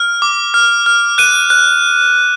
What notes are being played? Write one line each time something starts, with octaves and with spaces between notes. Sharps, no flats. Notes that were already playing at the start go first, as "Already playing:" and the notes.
Already playing: F6
D6
F6
F6
F#6 D#7
F#6